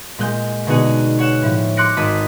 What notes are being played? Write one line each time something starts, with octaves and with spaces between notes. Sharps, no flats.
A#2 G#3 G6
B2 D3 D#4 F#4 G#4
C#5 F#5 E7
A2 F3
C6 D6 F#6 A#6 C#7 D7
G#1 A5 B5 D#6 B6